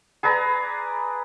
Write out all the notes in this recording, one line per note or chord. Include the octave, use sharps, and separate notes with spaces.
G#4 B4 D5 A#5